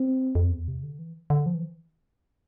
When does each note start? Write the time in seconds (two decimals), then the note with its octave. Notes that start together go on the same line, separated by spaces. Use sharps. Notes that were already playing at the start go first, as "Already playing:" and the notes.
Already playing: C4
0.35 F2
0.51 E2
0.68 C3
0.83 D3
0.99 E3
1.30 D3
1.46 F3
1.55 E3